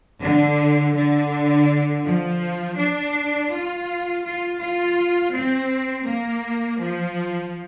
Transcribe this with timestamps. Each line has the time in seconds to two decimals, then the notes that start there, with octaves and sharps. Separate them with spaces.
0.21 D3
0.94 D3
2.04 F3
2.77 D4
3.50 F4
4.24 F4
4.59 F4
5.33 C4
6.06 A#3
6.79 F3